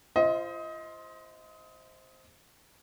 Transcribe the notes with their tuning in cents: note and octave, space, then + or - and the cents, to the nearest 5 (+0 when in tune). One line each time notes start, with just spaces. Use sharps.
F4 -30 C5 +0 D#5 +25